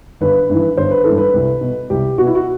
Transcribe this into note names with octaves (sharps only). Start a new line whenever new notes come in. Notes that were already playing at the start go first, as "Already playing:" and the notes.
G1 B4
G2 E3
G1 C5
B4
E3 A4
G2
B4
C2
B2
C2 G4
B2 F#4
E4
F#4